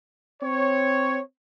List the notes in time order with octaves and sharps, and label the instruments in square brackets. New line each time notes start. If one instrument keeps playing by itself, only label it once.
[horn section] C4 C#5